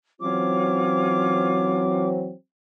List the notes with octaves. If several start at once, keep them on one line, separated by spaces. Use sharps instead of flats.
E3 F#3 C4 C#4 F4 D6